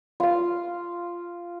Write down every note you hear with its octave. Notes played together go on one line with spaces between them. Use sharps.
F4 F5